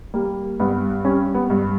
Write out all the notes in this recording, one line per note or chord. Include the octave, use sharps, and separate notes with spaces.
G3 A#3
G2 B3
G3 C#4
B3
G2